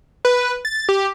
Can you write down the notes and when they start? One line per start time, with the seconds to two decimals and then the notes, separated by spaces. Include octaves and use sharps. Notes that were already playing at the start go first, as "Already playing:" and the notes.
0.25 B4
0.65 A6
0.89 G4